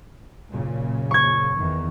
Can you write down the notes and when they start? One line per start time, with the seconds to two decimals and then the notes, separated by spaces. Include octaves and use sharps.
0.51 F#1 A#2 C#3
1.11 C#6 G#6
1.56 E2 D#3